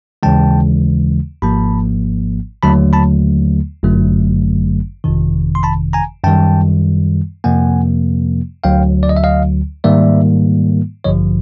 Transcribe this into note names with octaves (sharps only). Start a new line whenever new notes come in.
D#2 C#3 E3 G#3 G5 A5
G#1 G#2 F3 A#3 A5 B5
D#2 D3 F#3 A3 A5 B5
A5 B5
G1 F#2 D3 F#3 A3
G1 F2 C3 D#3
C6
A5 B5
G#5 A#5
F#2 D#3 G3 G5 A5
F2 C3 F3 A#3 F#5 G#5
D2 D3 F#3 F5 G5
D5
D#5
E5
D#5 F5
G#2 D#3 G3 A#3 D5 E5
A1 G2 D3 F3 C#5 D#5